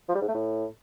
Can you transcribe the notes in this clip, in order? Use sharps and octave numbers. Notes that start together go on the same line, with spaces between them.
F3
G3
G#2
A3
A2